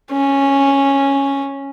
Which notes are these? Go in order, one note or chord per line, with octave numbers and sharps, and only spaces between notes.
C#4